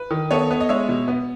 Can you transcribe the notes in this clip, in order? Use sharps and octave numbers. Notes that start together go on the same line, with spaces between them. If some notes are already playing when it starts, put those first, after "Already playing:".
Already playing: B4
D#3
B3 A4 C#5
B3
D#5
G#3 C#5 E5
B2
B3